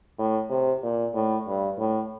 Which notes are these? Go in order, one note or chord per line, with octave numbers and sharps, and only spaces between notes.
A2
C3
A#2
A2
G2
A2